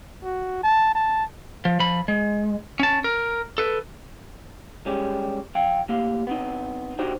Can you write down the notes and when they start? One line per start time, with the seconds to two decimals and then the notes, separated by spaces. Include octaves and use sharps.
0.24 F#4
0.64 A5
0.95 A5
1.65 F3
1.80 F3 B5
2.08 G#3
2.80 C#4 A5
3.04 A#4
3.58 A4 B4
4.86 G3 G#3 C#4 G4
5.55 F3 F5 G5
5.88 A2 A#3 G4 F5
6.27 B3 C4 D#4
6.99 D4 D#4 F#4 G4 C5 G5